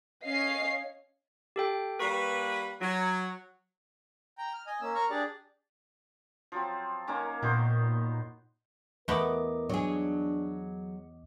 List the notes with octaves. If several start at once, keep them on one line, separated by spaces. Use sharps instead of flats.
C#4 C#5 D#5 F5 C7
G4 A4 G5
G3 A#3 B4 C#6 B6
F#3 F#4
G5 A#5
F6
D#5 G#5
A#3 C#4 E6
A#4 A#5 C#6 F6
D4 G4 G#4 D5
F3 F#3 C4
D#3 A#3 C#4
A#2 D#3 B3 C5
E2 A3 B3 A#4 D#5 D6
F#3 D4 G#4